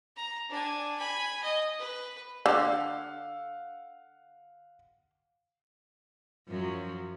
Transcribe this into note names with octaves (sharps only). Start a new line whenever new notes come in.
A#5
D4 G#5
G#5 B5
D#5
B4
D3 F5 F#5 E6
F#2 F3 F#3